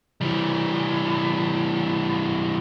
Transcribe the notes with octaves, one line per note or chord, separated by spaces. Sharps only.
E3 G3